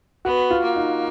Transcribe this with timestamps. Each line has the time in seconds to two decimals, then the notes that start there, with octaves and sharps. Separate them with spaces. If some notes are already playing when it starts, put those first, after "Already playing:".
0.25 B3 F#4
0.50 F4
0.64 A#3
0.76 D#4